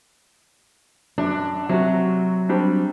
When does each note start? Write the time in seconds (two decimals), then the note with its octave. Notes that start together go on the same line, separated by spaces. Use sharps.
1.18 F#2 D4
1.69 C3 F#3 F#4
2.49 G3 C4 D4